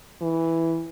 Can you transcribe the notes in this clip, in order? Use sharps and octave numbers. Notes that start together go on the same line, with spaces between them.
E3